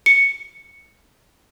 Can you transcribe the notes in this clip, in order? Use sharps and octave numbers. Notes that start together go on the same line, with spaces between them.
C#7